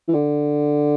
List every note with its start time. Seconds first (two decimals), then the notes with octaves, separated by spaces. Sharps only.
0.08 E3
0.14 D3